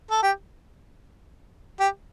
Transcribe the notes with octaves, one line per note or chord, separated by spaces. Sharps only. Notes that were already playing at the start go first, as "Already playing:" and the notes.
A4
G4
G4